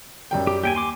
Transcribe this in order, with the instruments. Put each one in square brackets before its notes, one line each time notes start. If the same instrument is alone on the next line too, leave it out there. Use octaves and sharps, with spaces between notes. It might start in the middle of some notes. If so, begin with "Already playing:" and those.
[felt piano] F#2 G3 G5
[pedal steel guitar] G4
[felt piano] D#2 [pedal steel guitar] G4 G5 G#5
[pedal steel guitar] G#5 C6 D6